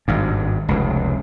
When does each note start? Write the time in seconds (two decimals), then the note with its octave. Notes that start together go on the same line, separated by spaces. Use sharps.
0.08 G#1 G2
0.69 F1 C#2